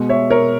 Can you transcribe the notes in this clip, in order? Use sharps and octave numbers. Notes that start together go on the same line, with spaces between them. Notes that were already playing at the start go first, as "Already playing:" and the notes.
Already playing: B2 G#3
C#5 E5
A#4 C#5